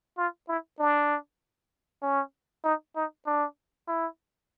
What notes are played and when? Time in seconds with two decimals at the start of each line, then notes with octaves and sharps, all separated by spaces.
0.18 F4
0.48 E4
0.79 D4
2.02 C#4
2.64 D#4
2.96 D#4
3.26 D4
3.88 E4